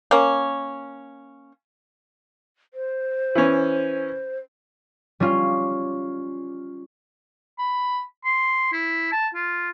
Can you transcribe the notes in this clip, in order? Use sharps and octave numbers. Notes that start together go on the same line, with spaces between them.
A#3 C#4
C5
E3 C#4
G3 C#4 F4
B5
C6
E4
A5
F4